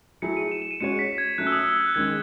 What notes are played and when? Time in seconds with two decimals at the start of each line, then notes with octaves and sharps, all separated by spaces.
0.22 F#3 A3 E4 G#4 C#7
0.37 D#7
0.52 E7
0.62 E7
0.71 D#7
0.80 G#3 C#4 F#4 C#5 C#7
0.99 B6
1.18 G#6
1.38 F#3 A3 C#4 F#6
1.47 E6
1.52 D#6
1.67 E6
1.81 F#6
1.95 D#3 G#3 C#4 G#6